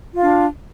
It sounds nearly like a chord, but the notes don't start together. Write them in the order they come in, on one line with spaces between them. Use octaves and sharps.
F4 F5 D4